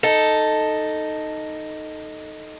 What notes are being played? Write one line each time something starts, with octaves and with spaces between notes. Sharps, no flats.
D#4 A4